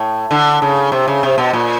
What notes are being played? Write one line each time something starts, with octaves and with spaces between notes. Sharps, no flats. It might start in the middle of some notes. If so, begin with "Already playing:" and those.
Already playing: A2
D3
C#3
C3
C#3
C3
B2
A#2